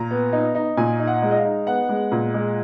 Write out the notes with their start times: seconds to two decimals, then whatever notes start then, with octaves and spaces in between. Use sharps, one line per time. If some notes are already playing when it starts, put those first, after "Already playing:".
Already playing: A#2 A#5
0.11 B3
0.33 D#4
0.55 D#4
0.77 A#2 G#5
1.00 D#4
1.07 F#5
1.22 G#3
1.31 D#5
1.37 F5
1.44 D#4
1.67 B3 F#5
1.89 G#3
2.12 A#2
2.34 G#3